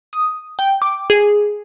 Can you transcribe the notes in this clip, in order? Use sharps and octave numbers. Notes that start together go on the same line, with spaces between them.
D#6
G5
D6
G#4